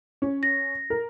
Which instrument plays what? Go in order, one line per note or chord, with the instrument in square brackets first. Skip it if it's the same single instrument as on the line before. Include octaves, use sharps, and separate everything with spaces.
[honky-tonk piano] C#4
[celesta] A#6
[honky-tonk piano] A#4